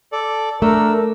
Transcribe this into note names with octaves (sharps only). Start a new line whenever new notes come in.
A4 D5
A3 D4 A#4 E6